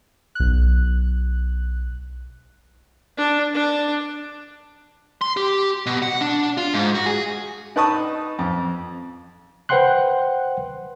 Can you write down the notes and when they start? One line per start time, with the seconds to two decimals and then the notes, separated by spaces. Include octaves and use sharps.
0.35 B1 F#6
3.17 D4
3.54 D4
5.22 C6
5.37 G4
5.86 B2
6.02 F#5
6.21 D4
6.57 F4
6.74 G#2
6.94 F#4
7.06 G#4
7.76 D#4 B4 A5 C#6 D#6
8.39 F2
9.69 B4 C5 F#5 G5 C6 F#6